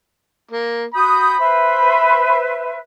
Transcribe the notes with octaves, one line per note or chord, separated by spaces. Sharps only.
A#3
F#4 B5 D#6 G6
B4 C5 E5